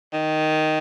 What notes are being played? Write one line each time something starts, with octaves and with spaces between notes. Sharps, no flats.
D#3